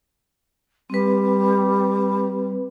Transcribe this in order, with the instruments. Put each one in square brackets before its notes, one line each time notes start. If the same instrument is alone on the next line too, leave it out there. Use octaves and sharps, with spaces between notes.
[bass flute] G3 [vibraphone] C4 B4